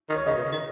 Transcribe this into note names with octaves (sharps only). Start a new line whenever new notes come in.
D#3
C#5
C#3 D#5
B2
C#3
D#3